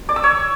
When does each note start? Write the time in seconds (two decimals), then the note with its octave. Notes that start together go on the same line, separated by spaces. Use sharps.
0.09 D5
0.16 E6
0.24 C#5